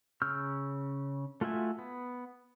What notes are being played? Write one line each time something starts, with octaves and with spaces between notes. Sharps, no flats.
C#3 C#6 E6 F6 G6
A3 F4 F#4 E5 G#5
B3